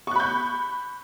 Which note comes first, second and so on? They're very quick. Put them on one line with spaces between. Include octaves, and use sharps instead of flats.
C#6 F#6 B5 G6